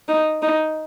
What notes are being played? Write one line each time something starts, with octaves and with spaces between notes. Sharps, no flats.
D#4
D#4